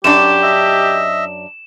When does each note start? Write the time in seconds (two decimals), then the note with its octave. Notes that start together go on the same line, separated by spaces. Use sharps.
0.04 F#2 D4 G4 E7
0.43 D#5 E5